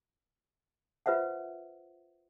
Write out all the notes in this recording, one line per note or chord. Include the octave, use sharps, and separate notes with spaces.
F4 B4 C5 E5 F#5